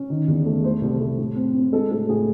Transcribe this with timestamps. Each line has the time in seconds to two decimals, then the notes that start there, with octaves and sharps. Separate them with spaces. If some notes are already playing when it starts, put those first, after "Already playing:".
Already playing: C#4
0.10 D#3
0.28 E2
0.45 A3
0.63 A3 C5
0.81 C2
1.00 A3
1.18 A2
1.36 C4
1.54 C4
1.72 G#3 A4
1.91 A2 A4
2.09 A2 G#4